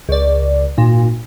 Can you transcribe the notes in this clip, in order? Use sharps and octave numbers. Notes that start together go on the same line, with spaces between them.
C#2 D5
G#1 A#2